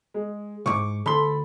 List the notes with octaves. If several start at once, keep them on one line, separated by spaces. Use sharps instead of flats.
G#3
B1 G#2 C#6 D6
D2 A4 B5 C6